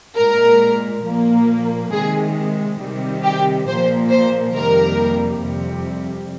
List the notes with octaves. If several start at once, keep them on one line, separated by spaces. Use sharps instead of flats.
A#2 G#3 A#4
A#2 F3 A#3
C3 D#3 G#3 G#4
C3 D#3 G3
G4
A#2 F3 A#3 C5
C5
F2 C3 D#3 G3 A#3 A#4
F2 C3 G3